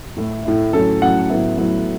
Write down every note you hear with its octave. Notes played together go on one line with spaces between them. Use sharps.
A2 A3 E4
A2 A3 E4
A2 F#3 C#4 A4
A2 F#3 C#4 F#5
A2 F#3 B3 E4
A2 F#3 B3 E4